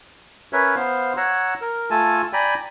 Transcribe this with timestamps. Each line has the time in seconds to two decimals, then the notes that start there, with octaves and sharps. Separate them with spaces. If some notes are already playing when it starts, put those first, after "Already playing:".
0.53 C#4 A#4 B4 C#5 E5
0.76 B3 C5 F5
1.17 C#5 F#5 A#5 E6
1.61 A#4
1.91 A3 F4 A4 G#5 A5
2.33 D5 G5 G#5 A#5 B5